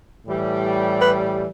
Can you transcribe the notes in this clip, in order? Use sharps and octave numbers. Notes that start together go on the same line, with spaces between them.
A2 E3 G3
B4